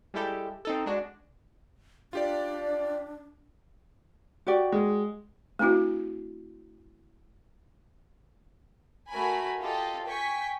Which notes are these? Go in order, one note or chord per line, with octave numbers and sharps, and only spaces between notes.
G3 G#3 E4 G4 A4
C4 D#4 A4
G#3 D4 F#4
D4 F4 G4 D5
F#4 G4 D5
G#3
A3 C4 D4 E4 F#4
A3 F#4 A#4 G#5 B5
F4 G4 A4 D#5
G5 G#5 C#6 B6